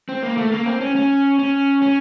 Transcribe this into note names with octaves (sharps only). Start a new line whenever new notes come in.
C4
A#3
A3
A#3
C4
C#4
C#4
C#4
C#4